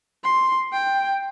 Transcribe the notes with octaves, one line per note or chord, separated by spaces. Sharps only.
C6
G5